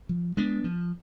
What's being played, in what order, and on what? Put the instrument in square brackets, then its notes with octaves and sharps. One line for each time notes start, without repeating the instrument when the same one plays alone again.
[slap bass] F3
G#3 B3 D4
F3